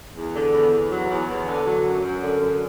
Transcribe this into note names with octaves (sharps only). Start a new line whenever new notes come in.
E2
D3
E2
E2
F#3
E2
E2
D3
F#3
F#2
F#2
D3
F#2